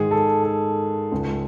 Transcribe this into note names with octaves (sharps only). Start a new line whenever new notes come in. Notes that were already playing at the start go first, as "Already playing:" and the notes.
Already playing: G#2 D#3 G#3 G#4
A4
A4
C#2 C#3 G#3